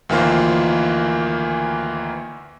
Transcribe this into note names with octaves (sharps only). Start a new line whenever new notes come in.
D2 D#3 E3 A#3 F4 C5